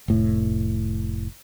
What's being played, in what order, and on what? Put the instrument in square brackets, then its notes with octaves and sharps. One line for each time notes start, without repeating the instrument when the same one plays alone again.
[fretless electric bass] F1 A2